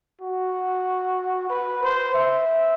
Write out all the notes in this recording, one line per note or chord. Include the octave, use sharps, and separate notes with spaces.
F#4
B4
C5
E5